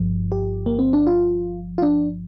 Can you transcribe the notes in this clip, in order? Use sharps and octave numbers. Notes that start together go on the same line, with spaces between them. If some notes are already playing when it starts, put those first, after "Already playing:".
Already playing: G1 G2 F3
G4
A#3
C4
D4
F4
F4
D4